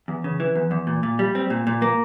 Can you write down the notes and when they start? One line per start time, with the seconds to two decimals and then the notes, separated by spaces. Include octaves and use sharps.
0.08 E2
0.24 C#3
0.40 E3
0.55 E2
0.71 E2
0.87 A#2
1.03 A#2
1.19 G3
1.35 C4
1.50 A#2
1.67 A#2
1.82 A#3